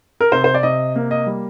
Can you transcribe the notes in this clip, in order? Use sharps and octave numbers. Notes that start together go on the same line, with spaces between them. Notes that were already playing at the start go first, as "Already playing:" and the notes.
A#4
C3 C5
C5
D5
C3 D#5
A#3
D#5
G3